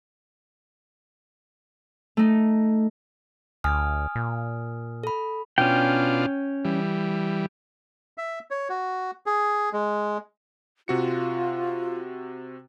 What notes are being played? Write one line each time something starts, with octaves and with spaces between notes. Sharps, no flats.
A3 D#4
D2 G#5 D#6 F6
A#2
A4 B5
B2 C#4 D4 F4 G5
E3 G3
E5
C#5
F#4
G#4
G#3
C3 F4 F#4 C#7